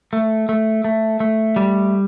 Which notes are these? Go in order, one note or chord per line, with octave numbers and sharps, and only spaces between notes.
A3
A3
A3
A3
G3